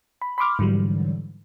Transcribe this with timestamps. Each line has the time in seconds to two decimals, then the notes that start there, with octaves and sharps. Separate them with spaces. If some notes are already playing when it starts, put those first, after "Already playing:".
0.22 B5
0.38 B5 C6 D6 F6
0.59 G#2 D3 E3 F#3 G3